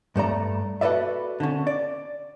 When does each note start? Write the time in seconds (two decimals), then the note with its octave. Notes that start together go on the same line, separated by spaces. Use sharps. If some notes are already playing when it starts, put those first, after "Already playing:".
0.16 G2 A3 D5 A#5
0.81 F#4 A4 B4 D5 E5
1.40 D3 C#4
1.67 D5